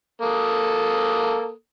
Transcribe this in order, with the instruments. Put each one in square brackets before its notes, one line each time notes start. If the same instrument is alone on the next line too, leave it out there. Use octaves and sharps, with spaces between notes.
[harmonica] A#3 A4 D#6